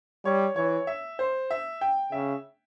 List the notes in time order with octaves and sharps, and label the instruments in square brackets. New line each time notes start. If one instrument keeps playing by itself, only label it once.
[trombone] G3 [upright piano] C#5
[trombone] E3 [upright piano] C#5
[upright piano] E5
C5
E5
G5
[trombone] C#3 [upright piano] E5